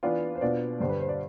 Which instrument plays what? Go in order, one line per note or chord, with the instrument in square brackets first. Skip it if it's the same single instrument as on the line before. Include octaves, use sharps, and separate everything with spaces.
[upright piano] E3 B3 D4 F4 D5
C5
B2 B3 D4 F4 D5
G2 D3 G3 C5
B4
C5
D5